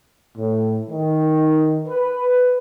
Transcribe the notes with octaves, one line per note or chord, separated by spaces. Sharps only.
A2
D#3
B4